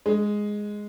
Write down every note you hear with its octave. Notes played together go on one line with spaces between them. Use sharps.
G#3